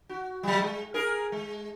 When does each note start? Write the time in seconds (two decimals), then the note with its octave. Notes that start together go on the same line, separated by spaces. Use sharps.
0.09 F#4
0.43 F#3 G3
0.61 G#3
0.94 G#4 A#4
1.32 G#3